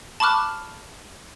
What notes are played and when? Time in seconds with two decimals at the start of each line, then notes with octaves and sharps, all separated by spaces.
0.20 A5 B5 C#6 D6 F6 F#6